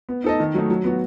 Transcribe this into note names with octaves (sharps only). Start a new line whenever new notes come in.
B3
D#4 A4 D#5
D#3
F#3 A3 D#4
F#3
B3 F#4